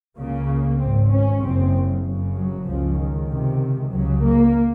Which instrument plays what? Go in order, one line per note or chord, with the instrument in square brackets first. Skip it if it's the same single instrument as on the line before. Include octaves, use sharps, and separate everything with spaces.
[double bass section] C#2 C#3 A#3
G#1 G#2 C4
C#4
F#1 F#2 C#3 C4
F#1 F#2 C#3
F#3
C#2 C#3 F3
D#3
C#2 C3
C#2 C#3 F#3
A#3